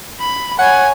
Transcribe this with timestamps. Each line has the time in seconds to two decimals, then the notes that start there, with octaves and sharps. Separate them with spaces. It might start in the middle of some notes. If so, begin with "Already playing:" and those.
0.21 B5
0.59 C#5 F#5 G#5